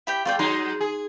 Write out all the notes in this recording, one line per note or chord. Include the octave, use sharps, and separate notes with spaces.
E4 G4 G5
G#3 F4 D5 G5
F#3 G#3 D#4 C6
G#4